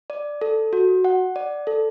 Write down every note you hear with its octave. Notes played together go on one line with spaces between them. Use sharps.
D5
A4
F#4
F#5
D5
A4